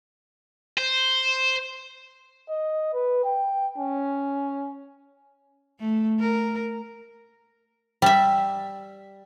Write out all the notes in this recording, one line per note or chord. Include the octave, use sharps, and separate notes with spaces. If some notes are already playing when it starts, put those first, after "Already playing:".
C5
D#5
B4
G5
C#4
A3
A#4
G3 E5